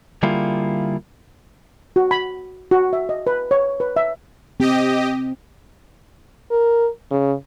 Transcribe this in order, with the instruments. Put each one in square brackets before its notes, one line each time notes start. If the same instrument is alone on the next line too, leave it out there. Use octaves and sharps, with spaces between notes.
[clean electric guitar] D3 G3 A#3 E4 F4 G#4
[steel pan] F#4
B5
F#4
E5
D#5
B4
C#5
B4
E5
[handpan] C4 [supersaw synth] G4 D#5
[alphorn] A#4
C#3